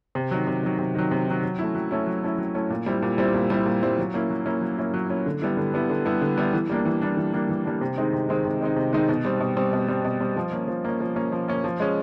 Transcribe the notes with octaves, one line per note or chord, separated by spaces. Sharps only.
C3
D#3 F#3
C3
D#3 F#3
C3
D#3 F#3
C3
D#3 F#3
F#3
A3 C#4 E4
F#3
A3 C#4 E4
F#3
A3 C#4 E4
F#3
A3 C#4 E4
A#2
G3 C4 E4
A#2
G3 C4 E4
A#2
G3 C4 E4
A#2
G3 C4 E4
F#3
A#3 C#4 E4
F#3
A#3 C#4 E4
F#3
A#3 C#4 E4
F#3
A#3 C#4 E4
D3
G3 B3 E4
D3
G3 B3 E4
D3
G3 B3 E4
D3
G3 B3 E4
E3
G3 A#3 D4
E3
G3 A#3 D4
E3
G3 A#3 D4
E3
G3 A#3 D4
C3
D#3 G#3 C4 D#4
C3
D#3 G#3 C4 D#4
C3
D#3 G#3 C4 D#4
C3
D#3 G#3 C4 D#4
B2
G3 C4
B2
G3 C4
B2
G3 C4
B2
G3 C4
F3
A#3 C#4
F3
A#3 C#4
F3
A#3 C#4
F3
A#3 C#4
F3
G#3 C#4